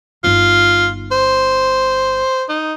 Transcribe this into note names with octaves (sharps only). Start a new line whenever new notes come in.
G1 D#4 F4
C5
D#4